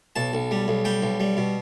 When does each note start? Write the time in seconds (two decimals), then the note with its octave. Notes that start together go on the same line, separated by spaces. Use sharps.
0.16 B1 A5
0.33 B1
0.51 G3
0.68 B1
0.85 G3 G5
1.02 B1
1.20 G3
1.37 B2